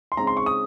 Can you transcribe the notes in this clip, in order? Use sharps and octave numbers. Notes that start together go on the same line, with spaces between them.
C6
C#3 G#3 C4 D#4 A#5
C6
C#6
D#6